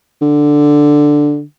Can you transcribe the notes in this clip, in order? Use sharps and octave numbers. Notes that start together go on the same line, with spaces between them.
D3